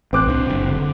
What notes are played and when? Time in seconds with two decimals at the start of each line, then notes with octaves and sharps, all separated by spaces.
0.13 A1 C4 D6 F#6
0.26 C2 C3 D4
0.50 F#1
0.69 D3